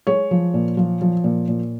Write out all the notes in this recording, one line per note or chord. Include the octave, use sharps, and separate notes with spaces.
G#3 C#5
F3
A#2
F3
F3
A#2
A#2